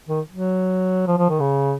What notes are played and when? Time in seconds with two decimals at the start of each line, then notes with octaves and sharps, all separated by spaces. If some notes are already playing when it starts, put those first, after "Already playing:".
0.09 D#3
0.31 F#3
1.07 F3
1.18 F3
1.29 D#3
1.40 C#3